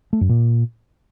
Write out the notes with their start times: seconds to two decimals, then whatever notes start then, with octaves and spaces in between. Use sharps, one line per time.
0.13 A3
0.21 F#2
0.29 A#2